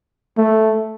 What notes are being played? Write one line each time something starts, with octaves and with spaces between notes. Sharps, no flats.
A3